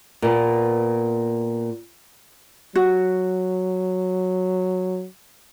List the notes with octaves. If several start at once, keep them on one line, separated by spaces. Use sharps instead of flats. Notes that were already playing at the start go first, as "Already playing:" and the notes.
A#2 B3
F#3 F#4